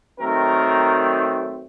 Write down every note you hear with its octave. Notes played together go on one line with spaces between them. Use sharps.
D#3 F#3 A3 C4 A#4